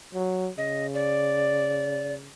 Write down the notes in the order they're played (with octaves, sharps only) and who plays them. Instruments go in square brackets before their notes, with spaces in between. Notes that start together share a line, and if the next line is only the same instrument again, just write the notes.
[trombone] F#3
[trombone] C#3 [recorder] D#5
[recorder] D5